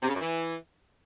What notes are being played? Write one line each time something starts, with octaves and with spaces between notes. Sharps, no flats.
C3
C#3
F#2
E3